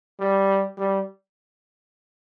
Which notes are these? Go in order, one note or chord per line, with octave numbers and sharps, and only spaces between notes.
G3
G3